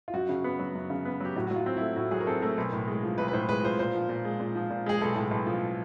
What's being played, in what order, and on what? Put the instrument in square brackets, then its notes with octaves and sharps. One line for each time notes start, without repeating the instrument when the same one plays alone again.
[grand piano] F4
[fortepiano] F#2 [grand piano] F#4
[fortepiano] C#3
B3
F#3
F#2
C#3
B3
[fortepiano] F#3 [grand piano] G4
[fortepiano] A2 [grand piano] F#4
[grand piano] F#4
[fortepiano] F#3
[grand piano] F4
[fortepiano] C4
[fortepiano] A3 [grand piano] E4
[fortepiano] A2 [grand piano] F#4
[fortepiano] F#3 [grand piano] G#4
[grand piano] A#4
[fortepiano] C4 [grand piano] A4
[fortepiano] A3 [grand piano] A#4
[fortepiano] B1
A2
G#3
F3
[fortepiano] B1 [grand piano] B4
[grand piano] B4
[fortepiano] A2 [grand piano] C5
[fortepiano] G#3 [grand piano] B4
[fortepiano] F3 [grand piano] C5
[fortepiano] A#2 [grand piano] C5
[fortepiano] F3
A#2
G#3
A#2
F3
A#2
[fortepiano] G#3 [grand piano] G#4
[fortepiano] B1 [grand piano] A4
[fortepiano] A2
B1
F3